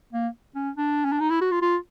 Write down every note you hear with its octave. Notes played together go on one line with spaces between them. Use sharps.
A#3
C#4
D4
C#4
D4
D#4
E4
F#4
F4
F4